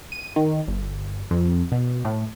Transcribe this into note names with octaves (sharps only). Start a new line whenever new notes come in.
D#7
D#3
G1
F2
B2
A2